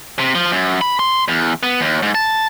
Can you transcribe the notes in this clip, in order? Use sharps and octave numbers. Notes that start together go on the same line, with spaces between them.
C3
F3
F#2
B5
C6
E2
B3
D#2
G#2
A5